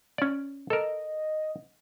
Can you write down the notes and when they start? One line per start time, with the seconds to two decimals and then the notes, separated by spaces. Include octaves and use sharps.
0.18 C#4 D5
0.70 A4 A#4 D#5